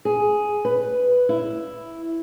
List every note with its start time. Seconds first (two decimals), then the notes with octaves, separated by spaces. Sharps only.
0.05 G#4
0.65 B4
1.29 E4